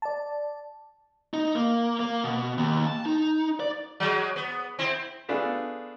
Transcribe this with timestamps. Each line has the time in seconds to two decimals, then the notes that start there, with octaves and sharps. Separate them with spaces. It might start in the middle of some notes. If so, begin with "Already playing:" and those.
0.02 D5 A5
1.34 D#4
1.55 A#3
2.00 A#3
2.24 B2
2.58 D#2
2.87 A5
3.06 D#4
3.60 D5
4.00 F#3 G#3
4.36 B3
4.79 C4 E4
5.29 A3 B3 D4 F4 G#4 A4